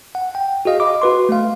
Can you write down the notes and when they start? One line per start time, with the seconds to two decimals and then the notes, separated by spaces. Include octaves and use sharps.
0.15 F#5
0.35 G5
0.65 F#4 G#4 D#5 F5
0.80 D#5 B5 D6
1.02 F#4 B4 C6
1.29 A3 F5